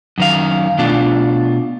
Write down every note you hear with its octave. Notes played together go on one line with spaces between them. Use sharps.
F#2 D#3 F5
B2 A3 D4 F4